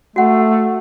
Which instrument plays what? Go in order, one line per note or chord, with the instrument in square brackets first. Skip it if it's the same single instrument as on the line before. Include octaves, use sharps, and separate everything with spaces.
[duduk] A3 [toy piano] F#4 F#5